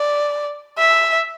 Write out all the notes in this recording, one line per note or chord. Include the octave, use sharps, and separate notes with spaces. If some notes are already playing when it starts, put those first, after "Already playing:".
Already playing: D5
E5